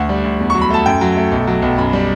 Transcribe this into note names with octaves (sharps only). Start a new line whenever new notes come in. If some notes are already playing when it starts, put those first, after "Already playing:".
Already playing: D2 F#5
G3
D2
E2
F#3 C#6
B5
A3 A5
F#2 G5
F#3
A3
B1
F#3
B1
F#2 B5
G3